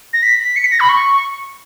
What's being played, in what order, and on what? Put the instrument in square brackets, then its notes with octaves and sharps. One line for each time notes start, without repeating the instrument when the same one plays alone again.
[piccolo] A#6
B6
B6
C#7
B6
A#6
B5
C#6